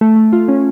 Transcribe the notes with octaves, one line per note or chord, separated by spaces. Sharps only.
A3
A3
F4
C#4